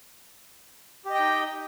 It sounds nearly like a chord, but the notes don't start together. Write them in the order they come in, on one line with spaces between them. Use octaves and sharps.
G4 D#5 G5 D#4